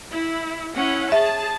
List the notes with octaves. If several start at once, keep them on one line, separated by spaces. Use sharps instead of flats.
E4
C#4 E4 F#5
G#4 E5 A5